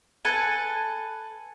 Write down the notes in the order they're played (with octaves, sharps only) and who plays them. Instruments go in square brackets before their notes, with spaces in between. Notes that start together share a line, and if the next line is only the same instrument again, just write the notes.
[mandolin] A4 B4 G#5